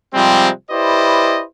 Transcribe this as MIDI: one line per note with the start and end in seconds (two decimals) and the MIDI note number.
0.14 0.50 48
0.14 0.50 53
0.14 0.50 55
0.14 0.50 56
0.14 0.50 60
0.71 1.43 64
0.71 1.43 67
0.71 1.43 71
0.71 1.43 72
0.71 1.43 74
0.71 1.43 75